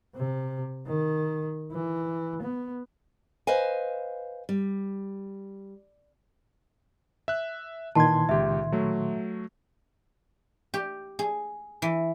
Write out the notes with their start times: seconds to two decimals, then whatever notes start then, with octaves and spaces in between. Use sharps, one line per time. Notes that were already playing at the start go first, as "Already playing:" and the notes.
0.15 C3
0.87 D#3
1.72 E3
2.42 B3
3.47 B4 C5 D#5 F5 G#5
4.49 G3
7.28 E5 F#6
7.95 A#2 D#3 E3 A5 C6 G#6
8.29 C#2 G4 E5
8.72 F#3 A3
10.74 G4
11.19 G#4
11.82 E3